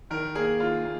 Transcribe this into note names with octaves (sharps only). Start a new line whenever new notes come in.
D#3 A#4
A#3 G#4
D#3 F4
A#3